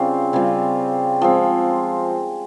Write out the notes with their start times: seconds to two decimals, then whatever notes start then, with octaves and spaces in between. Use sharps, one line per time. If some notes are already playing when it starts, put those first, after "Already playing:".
Already playing: C#3 G3 C4 F4
0.33 C#3 G3 C4 F4
1.21 F3 G#3 C4